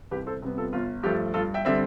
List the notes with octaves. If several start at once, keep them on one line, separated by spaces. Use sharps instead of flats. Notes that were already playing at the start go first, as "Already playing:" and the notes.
C2 G4 B4
A4 C5
C3 G3 B3
F4 A4
G1 F4
G2 F3 A3 G4
G2 F4 A4
E5 G5
D3 G3 C4 E5